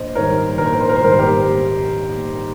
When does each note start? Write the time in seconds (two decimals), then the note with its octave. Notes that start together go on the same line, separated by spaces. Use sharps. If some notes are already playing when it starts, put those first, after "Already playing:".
Already playing: A#1 C5 D#5
0.15 G#2 D#3 G3 A#4 C#5
0.58 A#1 A#4
0.65 C5
0.73 A#4
0.81 C5
0.89 A#4
0.96 C5
1.00 G#2 D#3 G3 A#4
1.12 C5
1.19 G4 A#4